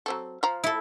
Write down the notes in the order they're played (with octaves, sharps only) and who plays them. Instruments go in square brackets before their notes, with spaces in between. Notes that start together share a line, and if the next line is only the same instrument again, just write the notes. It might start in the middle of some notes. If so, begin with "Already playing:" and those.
[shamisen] F#3 C4 A4
F3 F5 A#5
[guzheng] E4 A4